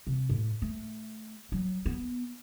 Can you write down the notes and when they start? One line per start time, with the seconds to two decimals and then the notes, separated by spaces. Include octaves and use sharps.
0.07 C3
0.30 A2
0.62 A3
1.52 F#3
1.86 B3